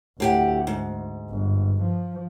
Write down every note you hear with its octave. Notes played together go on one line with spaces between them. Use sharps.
D2 A2 G4 F#5
G#2
G1
F3